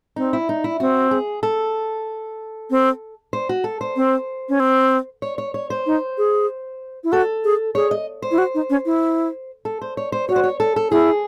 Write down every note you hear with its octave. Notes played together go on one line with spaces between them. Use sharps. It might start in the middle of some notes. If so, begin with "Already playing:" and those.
C4 D#4
E4
D#4
E4
C4 F#4
G#4
A4
C4
C5
F#4
A4
C5
C4
C#4
C4
C#5
C#5
C#5
C5
D#4
G#4
E4
F#4 A4
G#4
G#4 C#5
D#5
C5
E4
F#4
D#4
C#4
E4
A4
C5
C#5
C5
F#4 C#5
C5
C#5
A4
A4
E4 G#4